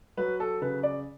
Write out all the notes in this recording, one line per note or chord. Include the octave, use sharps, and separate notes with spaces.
F#3 B4
A4
C#3 B4
D5